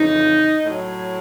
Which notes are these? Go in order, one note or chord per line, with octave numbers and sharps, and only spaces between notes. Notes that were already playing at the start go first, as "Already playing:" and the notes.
Already playing: F2 C#3 E3 D#4
A2 F#3